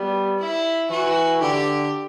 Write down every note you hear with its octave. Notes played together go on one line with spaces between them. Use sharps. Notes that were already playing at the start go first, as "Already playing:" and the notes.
Already playing: G3 B3
E4
E3 F#4
D3 G4